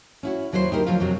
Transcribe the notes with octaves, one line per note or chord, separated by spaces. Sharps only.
C#4 E4 F#4
D#2 F#3 E4 G#4 C5
D2 D#4 G4 A4 A#4
F3 F#3 A3 F4
F2 C3 F#3 F#4